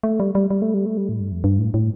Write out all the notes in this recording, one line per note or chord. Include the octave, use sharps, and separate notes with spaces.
A3
G3
G3
G3
A3
G3
A3
G3
A2
G2
F2
G2
A2
A2